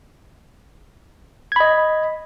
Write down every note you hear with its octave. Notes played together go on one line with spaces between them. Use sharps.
D#5 B5 G#6